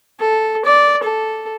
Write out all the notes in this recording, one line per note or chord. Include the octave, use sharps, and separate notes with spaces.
A4
D5
A4